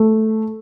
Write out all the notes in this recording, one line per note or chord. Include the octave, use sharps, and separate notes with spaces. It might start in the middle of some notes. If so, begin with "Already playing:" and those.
Already playing: A3